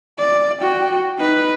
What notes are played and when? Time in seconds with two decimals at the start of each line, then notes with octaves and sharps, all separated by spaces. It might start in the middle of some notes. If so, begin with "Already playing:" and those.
0.19 D5
0.62 F#4 G5
1.18 D#4 B4